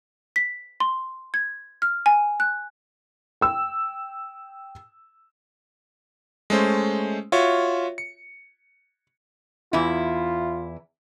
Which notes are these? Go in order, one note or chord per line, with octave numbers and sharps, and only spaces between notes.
B6
C6
G#6
F6
G#5
F#6
G5 E6
G#3 A3 C#4 C5
F4 F#4 C#5 E5 C#6
C#7
E2 E4 F4